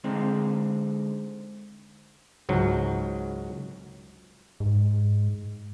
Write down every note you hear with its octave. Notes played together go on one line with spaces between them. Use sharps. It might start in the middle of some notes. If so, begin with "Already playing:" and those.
D3 G#3 C4 D#4
C#2 G#2 F#3
G#2